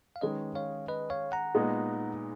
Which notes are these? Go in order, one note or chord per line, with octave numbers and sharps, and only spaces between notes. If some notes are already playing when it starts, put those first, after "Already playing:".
F5
D#3 G#3 C#4 B4 D#5
C#5 F5
B4 D#5
C#5 F5
F#5 A#5
A#2 G#3 B3 D#4